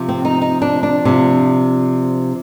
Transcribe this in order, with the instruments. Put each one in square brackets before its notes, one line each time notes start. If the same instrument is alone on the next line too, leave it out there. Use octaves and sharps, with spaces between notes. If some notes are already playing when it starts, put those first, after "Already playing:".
Already playing: [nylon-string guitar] C3 F3
C4
D#4
D#4
D4
D4
C3 F3